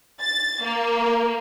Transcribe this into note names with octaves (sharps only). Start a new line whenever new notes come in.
A6
A#3